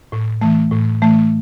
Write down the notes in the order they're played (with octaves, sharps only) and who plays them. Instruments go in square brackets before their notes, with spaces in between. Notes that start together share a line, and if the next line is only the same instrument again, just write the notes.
[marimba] A2
E3 A3
A2
E3 A3